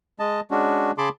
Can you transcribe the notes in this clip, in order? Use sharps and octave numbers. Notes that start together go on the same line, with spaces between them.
G#3 D#5 A5
G#3 C#4 D4 F#4
C#3 G#4 A5 B5 C6 D6